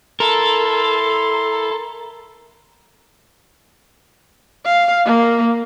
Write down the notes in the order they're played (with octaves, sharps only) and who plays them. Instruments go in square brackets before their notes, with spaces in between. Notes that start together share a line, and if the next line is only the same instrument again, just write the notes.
[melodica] E4 C6 [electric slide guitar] A4 [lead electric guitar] A#4
[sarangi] F5
A#3